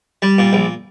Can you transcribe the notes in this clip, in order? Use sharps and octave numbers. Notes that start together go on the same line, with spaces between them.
G3
A#2
A#1